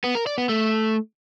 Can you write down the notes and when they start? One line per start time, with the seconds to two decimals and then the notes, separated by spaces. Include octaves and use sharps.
0.04 B3
0.15 A#4
0.26 D5
0.38 B3
0.49 A3